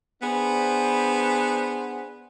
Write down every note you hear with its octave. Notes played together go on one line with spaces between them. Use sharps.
B3 D4 G#4 B4 C5